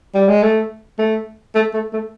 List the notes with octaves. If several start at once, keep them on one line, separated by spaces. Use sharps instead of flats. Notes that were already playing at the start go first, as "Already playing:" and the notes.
G3
G#3
A3
A3
A3
A3
A3